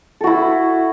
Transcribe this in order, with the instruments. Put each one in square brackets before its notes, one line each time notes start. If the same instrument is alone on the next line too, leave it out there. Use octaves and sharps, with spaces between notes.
[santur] A4
F#4
E4